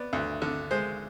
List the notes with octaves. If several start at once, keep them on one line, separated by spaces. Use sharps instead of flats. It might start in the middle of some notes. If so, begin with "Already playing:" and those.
Already playing: B3 D5
D2
D3
G#3 C5